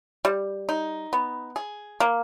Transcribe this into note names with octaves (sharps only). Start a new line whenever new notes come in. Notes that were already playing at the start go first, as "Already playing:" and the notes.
G3
D#4
B3
G#4
A#3